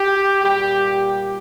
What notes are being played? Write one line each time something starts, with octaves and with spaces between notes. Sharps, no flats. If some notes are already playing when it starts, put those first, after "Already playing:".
Already playing: G4
A#2 G3 G4